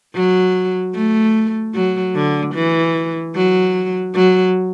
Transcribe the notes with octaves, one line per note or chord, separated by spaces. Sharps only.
F#3
A3
F#3
D3
E3
F#3
F#3